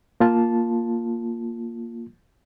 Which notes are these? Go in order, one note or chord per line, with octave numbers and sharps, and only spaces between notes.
A#3 F4 A5